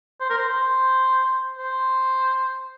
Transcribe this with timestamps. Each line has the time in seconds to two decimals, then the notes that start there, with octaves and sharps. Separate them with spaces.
0.21 C5
0.30 A#4
0.38 C5
0.48 C5
1.58 C5